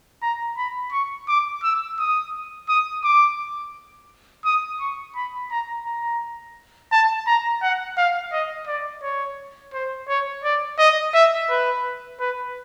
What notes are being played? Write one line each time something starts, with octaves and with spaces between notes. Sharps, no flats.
A#5
B5
C#6
D6
E6
D#6
D#6
D6
D#6
C#6
B5
A#5
A#5
A5
A#5
F#5
F5
D#5
D5
C#5
C5
C#5
D5
D#5
E5
B4
B4